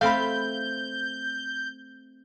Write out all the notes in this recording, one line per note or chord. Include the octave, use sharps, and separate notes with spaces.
A3 C4 F5 B5 G6